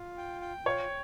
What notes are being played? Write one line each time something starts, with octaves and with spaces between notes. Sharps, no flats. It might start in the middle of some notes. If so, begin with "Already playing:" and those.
Already playing: F4
G5
G5
F4 C#5